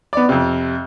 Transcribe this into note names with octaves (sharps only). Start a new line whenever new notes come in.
B3 D5
F2 C3